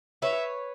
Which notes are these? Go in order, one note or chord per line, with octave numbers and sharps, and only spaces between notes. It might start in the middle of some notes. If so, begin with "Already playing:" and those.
B4 C#5 E5